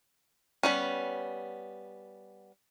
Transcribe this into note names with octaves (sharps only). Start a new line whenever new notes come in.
G3 B3 C#4